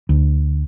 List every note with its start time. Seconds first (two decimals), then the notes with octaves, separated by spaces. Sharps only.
0.09 D2